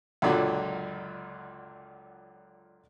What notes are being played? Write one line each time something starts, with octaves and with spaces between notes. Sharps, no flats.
C#2 F#2 A#2 D3 F#3